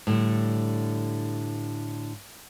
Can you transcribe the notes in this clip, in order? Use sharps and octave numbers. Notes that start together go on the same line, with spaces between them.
A2 D3 G3